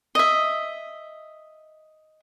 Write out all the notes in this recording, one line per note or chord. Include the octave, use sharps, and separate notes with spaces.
D#5 E5